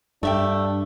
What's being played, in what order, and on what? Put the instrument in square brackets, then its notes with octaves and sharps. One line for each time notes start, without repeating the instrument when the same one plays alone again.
[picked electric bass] G2 [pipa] A3 E5 G5 [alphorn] D4